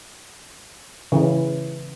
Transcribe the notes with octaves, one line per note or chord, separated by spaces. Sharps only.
C#3 E3